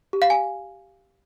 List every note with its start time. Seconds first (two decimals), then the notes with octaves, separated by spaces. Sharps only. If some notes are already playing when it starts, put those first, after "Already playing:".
0.13 G4
0.22 F5
0.30 G#5